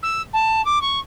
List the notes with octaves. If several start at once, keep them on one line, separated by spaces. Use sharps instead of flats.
E6
A5
D6
C#6